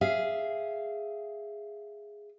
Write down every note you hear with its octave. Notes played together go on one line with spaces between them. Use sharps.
G#4 E5 F5